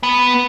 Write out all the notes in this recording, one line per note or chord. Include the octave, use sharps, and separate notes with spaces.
B3